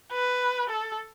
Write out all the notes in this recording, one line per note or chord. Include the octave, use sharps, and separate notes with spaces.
B4
A4